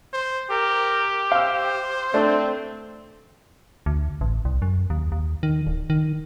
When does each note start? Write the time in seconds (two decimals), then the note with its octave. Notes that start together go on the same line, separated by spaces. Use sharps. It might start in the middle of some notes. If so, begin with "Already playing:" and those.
0.13 C5
0.51 G4 A#4
1.32 C5 F5 E6
2.14 A3 C4 D4
3.86 D2
4.21 A1
4.45 C2
4.62 F#2
4.90 D#2
5.12 D#2
5.43 D#3
5.66 D1
5.90 D#3